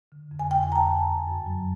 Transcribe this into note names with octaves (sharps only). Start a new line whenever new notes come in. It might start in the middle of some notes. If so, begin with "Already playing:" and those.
D3
F2
G#5
F2 G5
G#5
F2 A#5
A5
F#2
F#2
F#2
F#3